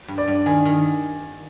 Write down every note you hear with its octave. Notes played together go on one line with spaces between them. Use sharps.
G2
D5
G2
D#3 G#5
D#3